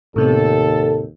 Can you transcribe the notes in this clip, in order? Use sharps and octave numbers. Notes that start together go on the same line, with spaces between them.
D#2 A2 C3 B3 A4